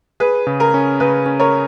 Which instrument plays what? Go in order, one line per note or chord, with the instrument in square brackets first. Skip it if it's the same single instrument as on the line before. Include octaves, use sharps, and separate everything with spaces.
[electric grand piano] G#4 [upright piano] B4
[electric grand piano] C#3
[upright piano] A#4
[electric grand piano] C#4
[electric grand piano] C#3 [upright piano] B4
[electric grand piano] C#4
[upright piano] A#4 C#5